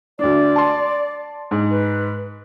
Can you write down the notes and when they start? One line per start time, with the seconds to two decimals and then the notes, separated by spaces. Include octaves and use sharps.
0.19 D2 D4 D5
0.56 A5 C6
1.51 G#2
1.71 B4